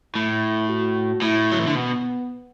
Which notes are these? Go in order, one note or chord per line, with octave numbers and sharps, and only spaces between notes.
A2 E4
F#4
A2 E4
F#3
E3
D3
B2 B3